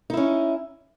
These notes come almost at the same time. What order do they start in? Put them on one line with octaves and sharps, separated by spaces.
D#4 E4 C#4